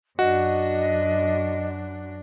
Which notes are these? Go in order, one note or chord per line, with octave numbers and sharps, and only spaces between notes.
F#2 D4 F#4 D#5